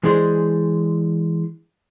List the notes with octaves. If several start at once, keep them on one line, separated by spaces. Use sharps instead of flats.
E3 G#3 D4 G#4 C5